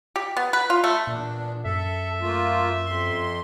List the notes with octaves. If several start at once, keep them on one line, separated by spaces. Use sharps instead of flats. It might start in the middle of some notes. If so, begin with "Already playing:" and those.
G4
B3
B4
F4
A3
E2 A#2 D4
F#2 A4 E5
A3 A#3 F4
F2 C6